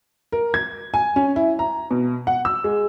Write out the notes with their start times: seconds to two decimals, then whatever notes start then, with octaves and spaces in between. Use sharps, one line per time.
0.32 A#4
0.54 G#6
0.94 G#5
1.16 C#4
1.36 E4
1.59 A#5
1.91 B2
2.27 F#5
2.45 E6
2.64 G#3